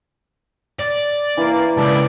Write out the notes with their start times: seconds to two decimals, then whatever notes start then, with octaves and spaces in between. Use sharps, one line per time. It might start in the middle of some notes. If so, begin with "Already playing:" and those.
0.79 D5
1.37 E3 A#3
1.77 C#2 A4 D5